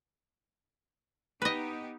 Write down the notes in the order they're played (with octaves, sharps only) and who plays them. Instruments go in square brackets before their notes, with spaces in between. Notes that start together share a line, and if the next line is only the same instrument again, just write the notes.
[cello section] B3 D#4 G4 [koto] B4 D#5